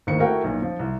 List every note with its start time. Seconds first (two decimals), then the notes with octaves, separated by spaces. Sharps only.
0.07 G#1 D#2 A2 D#3 C5 C#7
0.19 A3 E4 F#4 A#4 F#5 G5
0.44 B1 A#2
0.62 F3
0.79 C2